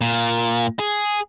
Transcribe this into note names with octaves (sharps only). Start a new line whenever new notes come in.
A#2
G#4